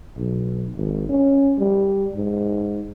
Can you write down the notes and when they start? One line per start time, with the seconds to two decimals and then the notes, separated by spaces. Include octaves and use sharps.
0.17 B1
0.76 G#1
1.09 C#4
1.58 G3
2.15 G#2